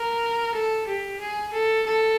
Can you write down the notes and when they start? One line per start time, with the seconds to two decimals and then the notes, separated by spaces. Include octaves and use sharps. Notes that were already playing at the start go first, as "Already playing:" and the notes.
Already playing: A#4
0.55 A4
0.87 G4
1.20 G#4
1.53 A4
1.87 A4